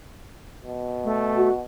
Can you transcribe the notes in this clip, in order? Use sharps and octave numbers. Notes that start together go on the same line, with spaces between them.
B2
A3
F#4